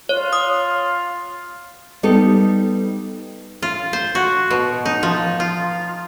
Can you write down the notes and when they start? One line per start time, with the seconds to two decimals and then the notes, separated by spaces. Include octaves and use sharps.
0.09 F4 C#5
0.33 D#6
2.03 G3 B3 D#4 A4
3.62 F4
3.93 C5
4.15 F#4
4.51 B2
4.85 D#4
5.03 F3
5.40 F4